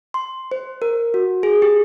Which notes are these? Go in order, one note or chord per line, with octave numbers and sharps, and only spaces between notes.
C6
C5
A#4
F#4
G#4
G4